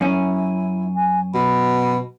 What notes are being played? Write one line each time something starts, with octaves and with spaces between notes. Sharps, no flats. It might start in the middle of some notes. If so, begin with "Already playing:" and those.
F#2 C#4 E4
G#5
B2 B5